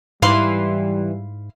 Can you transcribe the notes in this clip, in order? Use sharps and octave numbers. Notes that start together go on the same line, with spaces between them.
G#2 E3 G3 F5 B5 C6